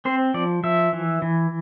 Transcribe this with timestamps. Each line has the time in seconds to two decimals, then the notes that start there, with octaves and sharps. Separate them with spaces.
0.05 C4 C5
0.34 F3 D5
0.63 F3 E5
0.93 E3
1.22 E3